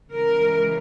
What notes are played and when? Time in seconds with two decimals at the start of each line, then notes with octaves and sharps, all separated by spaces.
0.12 C#3 E3 G#3 A#4